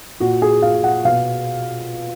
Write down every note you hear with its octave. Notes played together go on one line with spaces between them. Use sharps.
A#2 F#4
G#4
A#2 F5
F#5
B2 F5